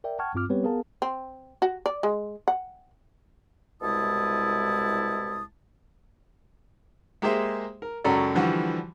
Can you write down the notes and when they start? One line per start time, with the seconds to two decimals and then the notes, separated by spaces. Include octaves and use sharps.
0.04 A#4 D5 E5 G5
0.19 F#5 G5 A5 C#6 F6 G#6
0.35 G2 C4 F4 D6 F6
0.49 G3 B3 C4 G4 B4 C#5
0.64 B3 G#4 A#4 F5 A5
1.02 C4
1.62 F#4
1.86 D5
2.03 G#3
2.48 F#5
3.82 C2 B2 G#3 E4 A5 D#6
7.22 G#3 A#3 G4 G#4 C5 E5
7.82 A#4
8.04 C#2 F#2 F#3 C#4 A4 D5
8.35 D3 E3 F3 G3 F#4